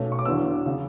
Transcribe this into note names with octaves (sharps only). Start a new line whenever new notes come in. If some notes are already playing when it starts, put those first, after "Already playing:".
Already playing: B1 B2 A3 C#4
C#6
D6
E2 D3 F#3 B3 E6
C#3